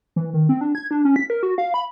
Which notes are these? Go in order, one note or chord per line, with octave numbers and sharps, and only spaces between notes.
E3
D#3
C4
D4
G#6
D4
C#4
B6
A#4
F#4
F5
B5